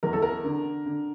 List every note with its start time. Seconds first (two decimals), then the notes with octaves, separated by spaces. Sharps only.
0.03 E2 A#4
0.13 A4
0.22 A#4
0.44 D3
0.86 D3